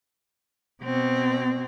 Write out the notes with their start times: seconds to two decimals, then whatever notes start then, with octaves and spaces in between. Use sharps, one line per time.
0.83 B2 C4